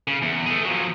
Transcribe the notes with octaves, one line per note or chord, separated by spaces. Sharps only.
C#3
E2
A3 G#4
F3 F#3